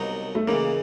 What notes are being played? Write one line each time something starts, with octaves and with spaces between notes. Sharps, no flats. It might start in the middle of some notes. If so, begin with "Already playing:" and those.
Already playing: C2 B2 F#3 A#3 D#4
A3
C#2 C#3 E3 A#3